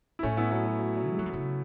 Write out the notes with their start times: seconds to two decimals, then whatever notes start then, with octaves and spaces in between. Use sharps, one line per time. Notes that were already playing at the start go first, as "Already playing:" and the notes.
0.19 E4
0.23 A2 A3 C#4
0.37 B3 E4
0.51 F#3 B3
0.65 F#3
0.79 F#3
0.97 F#3
1.13 A3
1.19 F#3
1.26 E3
1.33 C#3